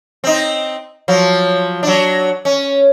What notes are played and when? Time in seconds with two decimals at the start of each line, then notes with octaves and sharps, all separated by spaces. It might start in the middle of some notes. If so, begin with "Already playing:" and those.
0.24 C4 D#4
1.08 F3 F#3
1.83 F#3 D4
2.45 C#4